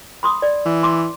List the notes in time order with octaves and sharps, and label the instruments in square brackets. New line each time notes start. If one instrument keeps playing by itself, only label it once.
[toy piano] B5 C6 D#6
D5
[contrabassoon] E3
[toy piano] C6 D6